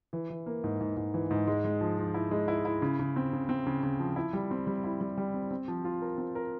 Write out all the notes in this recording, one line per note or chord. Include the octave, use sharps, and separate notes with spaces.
E3
E3
A#3
G#2
G#2
G#2
E3
G#2
G#3
G#3
F3
F3
E4
G#3
E4
E4
C#3
C#3
C4
C#3
C4
C#3
C#3
F3
E4
G3
C4
G3
E4
G3
G3
C4
C4
F3
F4
A#4
C4
A#4